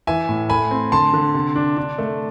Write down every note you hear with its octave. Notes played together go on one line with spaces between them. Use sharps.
E3 E5 G#5
A2
A3 G#5 B5
C4
D3 A5 C6
D3
C3
D4
D4
A3